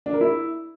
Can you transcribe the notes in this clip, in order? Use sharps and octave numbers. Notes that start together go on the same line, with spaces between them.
D4
A#4
E4